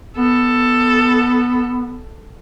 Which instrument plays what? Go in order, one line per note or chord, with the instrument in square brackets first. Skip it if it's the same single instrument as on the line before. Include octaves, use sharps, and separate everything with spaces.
[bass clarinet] B3 [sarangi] A4